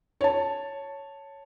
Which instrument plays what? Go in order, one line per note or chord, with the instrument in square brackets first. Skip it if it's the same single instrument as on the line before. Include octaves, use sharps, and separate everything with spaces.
[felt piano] C#5 A5